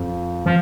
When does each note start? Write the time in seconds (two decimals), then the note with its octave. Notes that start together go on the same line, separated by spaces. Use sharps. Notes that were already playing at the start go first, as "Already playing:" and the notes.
Already playing: F2
0.46 F3